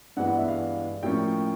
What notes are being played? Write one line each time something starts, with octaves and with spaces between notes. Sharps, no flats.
G2 E3 G#3 B3 F#5
F#5
E5
F5
A2 F3 A#3 C#4 G5